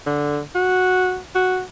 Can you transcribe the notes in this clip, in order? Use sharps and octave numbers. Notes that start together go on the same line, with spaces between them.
D3
F#4
F#4